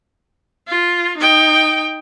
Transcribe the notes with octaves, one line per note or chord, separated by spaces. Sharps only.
F4
D#4 G5